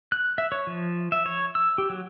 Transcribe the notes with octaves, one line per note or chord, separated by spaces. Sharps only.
F#6
E5
C#5
F3
E5
C#5
E6
G4
F#3